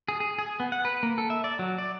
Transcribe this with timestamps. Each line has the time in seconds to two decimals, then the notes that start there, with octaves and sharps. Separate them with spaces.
0.08 G#4
0.20 G#4
0.39 G#4
0.60 B3
0.72 F#5
0.85 B4
1.03 A#3
1.18 A4
1.30 E5
1.44 D5
1.59 F#3
1.78 D5